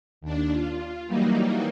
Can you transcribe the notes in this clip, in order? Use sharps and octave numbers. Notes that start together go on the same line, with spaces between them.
D#2 D4
F4
E3 F#3 G3 A#3 D#4